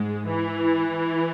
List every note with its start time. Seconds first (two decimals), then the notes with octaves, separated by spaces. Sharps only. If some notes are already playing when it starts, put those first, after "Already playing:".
Already playing: G#2 G#3
0.27 E3